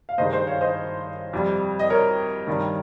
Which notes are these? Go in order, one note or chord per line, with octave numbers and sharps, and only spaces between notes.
F5
G2 D#3 G#3 C5 D#5
C5 D#5
C#5 F5
C5 D#5
F2 C3 G3
D#5
A#4 C#5
G2 D#3 G3